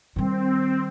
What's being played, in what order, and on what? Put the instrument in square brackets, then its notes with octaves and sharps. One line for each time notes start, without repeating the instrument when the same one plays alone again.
[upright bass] D#3 G3 [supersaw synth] C4